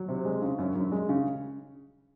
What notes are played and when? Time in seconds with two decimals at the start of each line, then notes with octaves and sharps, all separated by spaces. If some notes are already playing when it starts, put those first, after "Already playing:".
Already playing: F#3
0.08 C3
0.25 G#3
0.42 C#3
0.58 F#2
0.75 F#2
0.92 G#3
1.09 C#3